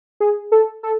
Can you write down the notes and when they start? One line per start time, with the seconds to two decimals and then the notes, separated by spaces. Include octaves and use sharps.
0.20 G#4
0.52 A4
0.83 A4